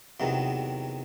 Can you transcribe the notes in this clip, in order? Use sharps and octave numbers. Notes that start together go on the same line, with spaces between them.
E2 C3 D#3 F#3 B3